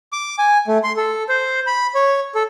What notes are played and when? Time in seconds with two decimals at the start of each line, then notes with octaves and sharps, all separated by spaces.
0.13 D6
0.39 G#5
0.68 A3
0.84 C6
0.97 A4
1.29 C5
1.67 B5
1.95 C#5
2.35 A4